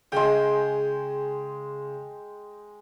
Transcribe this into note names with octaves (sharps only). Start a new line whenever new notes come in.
C#3 G#3 G5